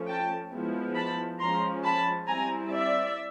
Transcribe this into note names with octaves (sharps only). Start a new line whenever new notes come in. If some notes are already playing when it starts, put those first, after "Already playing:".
Already playing: F3 A3 C#4
G5 A5
F3 G#3 B3 E4
A5 B5
F3 G#3 C#4 A#5 C6
A5 B5
G3 C4 E4 G#5 A#5
D5 E5